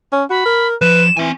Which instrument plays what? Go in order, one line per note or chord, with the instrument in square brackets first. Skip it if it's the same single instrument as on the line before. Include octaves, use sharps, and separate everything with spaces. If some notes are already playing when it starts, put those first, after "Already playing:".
[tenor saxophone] C#4
[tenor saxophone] F#4 [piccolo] B5
[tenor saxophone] A#4
[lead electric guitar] F3 [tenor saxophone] B4 [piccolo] E7
[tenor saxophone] E3 [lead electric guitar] C4 G#5